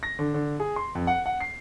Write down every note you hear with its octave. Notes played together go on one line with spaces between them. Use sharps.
A#6
D3
D3
G#4
C6
F2
F#5
F#5
C7